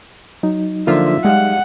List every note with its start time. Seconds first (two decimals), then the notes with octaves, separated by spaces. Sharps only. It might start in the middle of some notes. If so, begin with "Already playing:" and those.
0.43 F#3 D#4
0.87 D3 F3 A#3 F4 E5
1.25 G3 G#3 F5 F#5